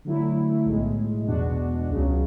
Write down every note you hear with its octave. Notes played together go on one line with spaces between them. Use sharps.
D3 F#3 A3 E4
B1 A2 G#3
E2 B2 G#3 D4 F#4
C#2 C#3 F#3